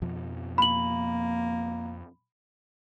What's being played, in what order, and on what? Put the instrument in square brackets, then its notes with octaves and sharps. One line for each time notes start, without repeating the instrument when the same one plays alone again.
[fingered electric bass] F2 B2 F3
[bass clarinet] A#3 [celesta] B5 F#7